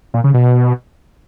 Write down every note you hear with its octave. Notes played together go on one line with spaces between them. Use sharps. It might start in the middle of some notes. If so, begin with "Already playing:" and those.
A#2
C#3
B2